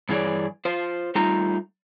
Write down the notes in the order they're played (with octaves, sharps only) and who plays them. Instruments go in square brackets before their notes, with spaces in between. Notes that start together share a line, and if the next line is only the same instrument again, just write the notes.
[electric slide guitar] G2 E3 G#4 C#5 D5
F4 C5 F5
G3 A3 D#4 F4 A#5